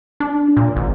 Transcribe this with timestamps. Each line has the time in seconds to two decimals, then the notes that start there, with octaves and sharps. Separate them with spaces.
0.20 D4
0.57 A#2
0.76 G#1